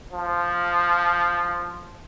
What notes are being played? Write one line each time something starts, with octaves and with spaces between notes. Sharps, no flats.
F3